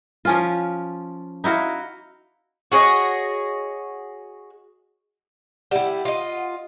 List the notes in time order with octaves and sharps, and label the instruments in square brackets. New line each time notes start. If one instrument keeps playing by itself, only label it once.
[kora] F3 C#4 F4
D#4 E4 F#4 F5
[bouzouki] F#4 G#4 C#5 D#5
[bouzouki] G3 E4 [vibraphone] F#5
[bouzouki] F4 D#5